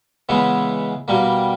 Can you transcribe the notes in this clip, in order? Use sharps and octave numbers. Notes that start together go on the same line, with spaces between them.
C#3 E3 G#3 B3
B2 G3 A#3